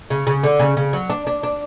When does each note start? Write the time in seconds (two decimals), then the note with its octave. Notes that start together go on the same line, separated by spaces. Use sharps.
0.10 C#3
0.27 C#3
0.43 D3
0.59 C#3
0.77 C#3
0.93 F#3
1.10 D4
1.27 D4
1.43 D4